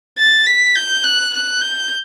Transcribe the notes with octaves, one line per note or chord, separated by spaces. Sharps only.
A6
B6
G6
F#6
F#6
G6